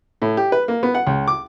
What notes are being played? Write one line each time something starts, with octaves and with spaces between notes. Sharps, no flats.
A2
G4
B4
A#3
B3
F#5
C#2
D6